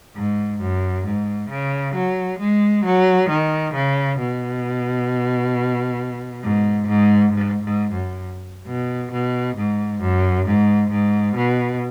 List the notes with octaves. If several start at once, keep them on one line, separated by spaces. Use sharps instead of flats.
G#2
F#2
G#2
C#3
F#3
G#3
F#3
D#3
C#3
B2
G#2
G#2
G#2
G#2
F#2
B2
B2
G#2
F#2
G#2
G#2
B2